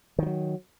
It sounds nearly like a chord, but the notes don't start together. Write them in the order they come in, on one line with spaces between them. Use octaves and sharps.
D#3 F3 F#3